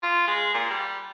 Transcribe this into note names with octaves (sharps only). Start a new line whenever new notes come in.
F4
G#3
A#2
G3